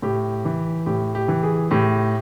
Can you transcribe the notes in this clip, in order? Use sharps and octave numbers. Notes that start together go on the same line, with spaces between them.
A2 G4
E3
A2 G4
G4
E3
G#4
A2 G4